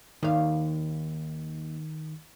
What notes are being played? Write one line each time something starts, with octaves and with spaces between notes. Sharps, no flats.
D#2 D#3 F5